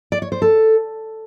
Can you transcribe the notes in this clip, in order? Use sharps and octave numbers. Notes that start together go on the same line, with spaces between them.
D5
C#5
C5
A4